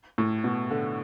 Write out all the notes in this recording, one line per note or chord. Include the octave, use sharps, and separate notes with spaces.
A2
B2
D3